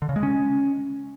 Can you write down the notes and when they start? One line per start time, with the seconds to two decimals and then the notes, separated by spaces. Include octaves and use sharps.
0.02 D3
0.09 C#3
0.16 G#3
0.23 C#4